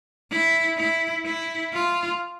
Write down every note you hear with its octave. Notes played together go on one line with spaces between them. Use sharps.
E4
E4
E4
F4